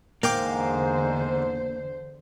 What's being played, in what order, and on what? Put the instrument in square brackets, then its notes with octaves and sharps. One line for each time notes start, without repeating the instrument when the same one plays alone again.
[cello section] E2 D3 C5 [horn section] G#2 [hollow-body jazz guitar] A#3 [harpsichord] F5 G5 D6